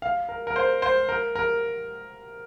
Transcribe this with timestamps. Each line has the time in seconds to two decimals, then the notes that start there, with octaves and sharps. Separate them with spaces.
0.02 F5
0.29 A#4
0.47 A#4
0.56 C5
0.82 C5
1.09 A#4
1.35 A#4